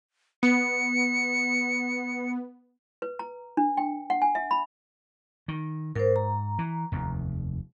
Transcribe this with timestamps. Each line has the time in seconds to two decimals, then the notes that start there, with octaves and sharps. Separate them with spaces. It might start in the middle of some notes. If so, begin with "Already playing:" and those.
0.43 B3 C#7
3.02 B4
3.19 A#5
3.57 D4
3.77 G5
4.10 F#5
4.22 G#5
4.35 E5
4.51 B5
5.48 D#3
5.95 G#2 A#4 C5
6.16 A#5
6.59 E3
6.92 F1 D#2